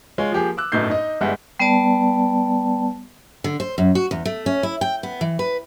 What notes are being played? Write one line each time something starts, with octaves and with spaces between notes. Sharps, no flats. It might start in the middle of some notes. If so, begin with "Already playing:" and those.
G#3 F4 C#5
F3 A#3 G4 G#4
D6 E6 F#6
G1 F#2 A2 D#4 G6 C7
D#4 D#5
G1 G3 G#3 E5 F#5
G3 B3 B4 D5 A5
D3
C5
F#2
F#4
E2
A3
C#4
E4
G5
B3
E3
B4